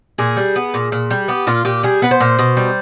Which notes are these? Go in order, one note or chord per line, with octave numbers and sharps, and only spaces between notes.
A#2 G#4
G3
B3
A#2
A#2
G3
B3 G4
A#2 F4
A#2 G4
G3 G#4
B3 B4
C5
A#2
B2
G3